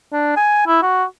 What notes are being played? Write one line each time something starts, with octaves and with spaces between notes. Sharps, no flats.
D4
G#5
E4
F#4